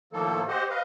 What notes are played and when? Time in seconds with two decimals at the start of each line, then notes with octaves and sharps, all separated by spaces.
0.13 A2 D#3 F3 A#3 A4
0.48 G4 C5 D#5 F#5
0.70 B4 D#5 F5